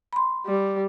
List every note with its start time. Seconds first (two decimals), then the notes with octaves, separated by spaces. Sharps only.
0.13 B5 C6
0.46 G3